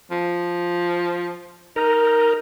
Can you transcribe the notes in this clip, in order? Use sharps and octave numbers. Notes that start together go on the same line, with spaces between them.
F3
D#4 A#4